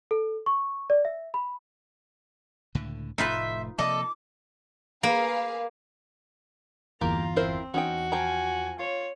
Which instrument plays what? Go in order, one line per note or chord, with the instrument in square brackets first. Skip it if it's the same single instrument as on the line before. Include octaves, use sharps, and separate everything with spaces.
[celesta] A4
C#6
D5
E5
B5
[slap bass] C#2 A2 D3
[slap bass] F1 A2 A3 [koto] D#4 F4 B4 [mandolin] C5 E5
[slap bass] C3 F3 A#3 [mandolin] A4 D5 D#5 [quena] D6
[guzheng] A#3 [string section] G#4 B4 F5
[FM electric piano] G1 E2 [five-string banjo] A#3 G4 [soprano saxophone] F4 [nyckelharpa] A#5
[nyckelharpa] C4 [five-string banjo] E4 A#4 C5
[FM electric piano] E2 [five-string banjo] C#4 D#4 G5 [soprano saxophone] F#4
[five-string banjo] F3 G5 A#5 [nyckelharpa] G#5
[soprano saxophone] F4 [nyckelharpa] C#5